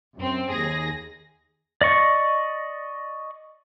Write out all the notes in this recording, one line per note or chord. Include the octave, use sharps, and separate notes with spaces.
F#2 C4
D#2 G#4 A#6
D5 D#5 C#6